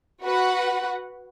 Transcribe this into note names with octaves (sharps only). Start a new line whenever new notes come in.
F#4 B4 F#5